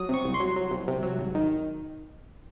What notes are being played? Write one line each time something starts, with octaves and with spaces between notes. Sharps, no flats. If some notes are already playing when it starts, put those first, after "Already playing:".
Already playing: F#3 D#6
C3 C#6
C2
C6
F#3
F#3
C2
C3
F#3
G#1
D#3